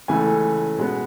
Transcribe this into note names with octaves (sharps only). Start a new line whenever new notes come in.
C#2 C#3 E3 A3 G#5
B2 G#3 B3